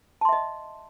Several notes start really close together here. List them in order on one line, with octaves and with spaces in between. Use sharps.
A5 C6 E5 D#5